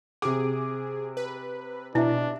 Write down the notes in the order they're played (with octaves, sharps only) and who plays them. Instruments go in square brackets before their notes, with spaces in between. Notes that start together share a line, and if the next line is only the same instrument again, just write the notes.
[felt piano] C3 D6 [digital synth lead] G#4
[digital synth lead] B4
[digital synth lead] B2 [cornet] D4 [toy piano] E4 E5